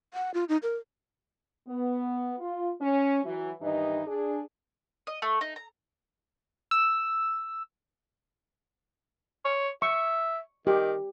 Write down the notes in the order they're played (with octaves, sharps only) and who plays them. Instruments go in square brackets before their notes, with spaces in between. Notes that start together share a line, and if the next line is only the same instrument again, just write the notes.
[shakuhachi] F#5
F4
D#4
A#4
[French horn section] B3
F4
C#4
E3 F#3
G2 D#3 E3 D#4 G4 D#5
D4 G#4
[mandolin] D#5
A3
D#4
A#5
[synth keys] E6
[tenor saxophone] C#5
[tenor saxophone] E5 [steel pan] C#6
[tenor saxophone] D#3 [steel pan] G4